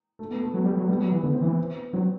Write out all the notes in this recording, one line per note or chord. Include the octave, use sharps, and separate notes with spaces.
A3
B3
A3
F#3 B3
G3 A3
F#3
G3 B3
F#3
E3
D3 B3
C4
E3 B3
F#3 C4